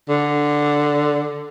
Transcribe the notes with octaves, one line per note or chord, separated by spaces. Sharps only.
D3